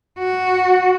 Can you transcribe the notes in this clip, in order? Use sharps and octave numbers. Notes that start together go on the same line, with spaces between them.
F#4